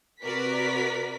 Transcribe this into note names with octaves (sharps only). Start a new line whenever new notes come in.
C3 F#4 A#4 B4 D5 B6